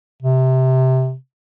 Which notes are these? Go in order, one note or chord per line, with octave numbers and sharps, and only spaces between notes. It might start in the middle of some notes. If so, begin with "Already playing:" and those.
C3